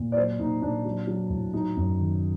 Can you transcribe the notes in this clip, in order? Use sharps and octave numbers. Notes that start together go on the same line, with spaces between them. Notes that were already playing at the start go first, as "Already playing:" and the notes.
Already playing: A#2
D5
F#3 C5
A#2 D#4
A#2 D4
F#3
F#3
A2
F#3 D#4
F#2
D#3